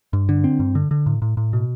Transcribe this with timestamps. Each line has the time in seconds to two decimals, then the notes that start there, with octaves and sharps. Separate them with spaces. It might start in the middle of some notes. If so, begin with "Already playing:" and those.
0.13 G2
0.29 D3
0.44 C4
0.60 G2
0.75 D3
0.91 D3
1.06 A2
1.22 A2
1.37 A2
1.53 B2